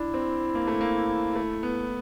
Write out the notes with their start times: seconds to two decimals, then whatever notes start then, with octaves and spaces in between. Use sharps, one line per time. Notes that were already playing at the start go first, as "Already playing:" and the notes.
Already playing: D4 E4
0.14 C4
0.55 A#3
0.67 A3
0.81 A#3
1.36 A3
1.63 B3